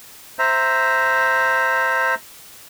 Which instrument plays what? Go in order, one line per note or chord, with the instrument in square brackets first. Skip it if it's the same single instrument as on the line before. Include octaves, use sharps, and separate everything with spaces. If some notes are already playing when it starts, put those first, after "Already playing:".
[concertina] C5 E5 A#5